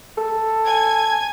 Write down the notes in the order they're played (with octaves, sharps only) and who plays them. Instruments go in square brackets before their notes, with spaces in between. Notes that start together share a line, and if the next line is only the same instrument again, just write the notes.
[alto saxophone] A4
[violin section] G#5 G#6